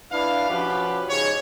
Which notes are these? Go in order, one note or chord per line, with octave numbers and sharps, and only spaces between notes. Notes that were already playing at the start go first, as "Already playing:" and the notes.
D4 E4 B4 F5
F3 C#4 F#4 G4 B4
G#2 C#3 G#3 C#5